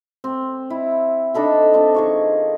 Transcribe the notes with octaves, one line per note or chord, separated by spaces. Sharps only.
C4
E4
D4 D#4 A4 B5
C4 D4 F4
D#3 G#4 C#6